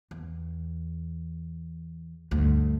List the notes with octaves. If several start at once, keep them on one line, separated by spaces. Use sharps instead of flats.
E2
D2 G2